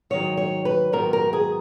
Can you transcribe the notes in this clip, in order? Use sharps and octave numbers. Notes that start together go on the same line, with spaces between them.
G#2 D#3 F#3 C#5
C#5
B4
G#2 D#3 F#3 B3 A#4
A#4
G#4